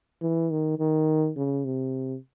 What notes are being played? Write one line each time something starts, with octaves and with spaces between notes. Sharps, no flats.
E3
D#3
D#3
C#3
C3